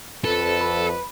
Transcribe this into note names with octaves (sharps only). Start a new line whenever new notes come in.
F2 A4 B4
B5